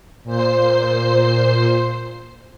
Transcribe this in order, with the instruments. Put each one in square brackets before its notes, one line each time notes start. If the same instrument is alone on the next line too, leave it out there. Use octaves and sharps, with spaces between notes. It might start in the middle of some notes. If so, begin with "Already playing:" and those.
[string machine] A#2 C5 C7